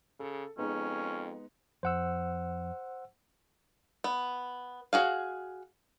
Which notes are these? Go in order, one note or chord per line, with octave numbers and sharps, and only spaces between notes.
C#3 A4
F2 G#3 B3 C#4 D#4
F2 C5 F#5 E6
B3
F#4 G#4 F5